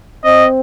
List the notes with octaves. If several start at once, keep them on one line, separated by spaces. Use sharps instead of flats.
C4 D#5